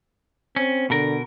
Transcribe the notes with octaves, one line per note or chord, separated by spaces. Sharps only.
C4 C#4
B2 D3 A#4